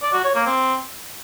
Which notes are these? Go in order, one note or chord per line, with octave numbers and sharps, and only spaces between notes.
D5
F#4
C#5
A#3
C4